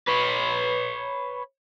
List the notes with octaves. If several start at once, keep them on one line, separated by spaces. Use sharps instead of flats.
B4 C#5